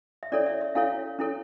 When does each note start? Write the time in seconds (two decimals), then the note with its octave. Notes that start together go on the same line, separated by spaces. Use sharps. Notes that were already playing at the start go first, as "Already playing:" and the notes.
0.23 E5
0.32 C#4 E4 A4 C#5 D5
0.46 E5
0.61 E5
0.75 C#4 E4 A4 C#5 F5
1.19 C#4 E4 A4 C#5